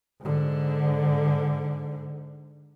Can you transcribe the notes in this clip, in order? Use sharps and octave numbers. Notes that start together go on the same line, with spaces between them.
G#2 D3